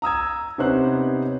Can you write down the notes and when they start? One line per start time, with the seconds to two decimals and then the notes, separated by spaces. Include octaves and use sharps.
0.02 A#5 D#6 E6 G#6
0.58 C3 B3 C#4 D#4 C5 F#6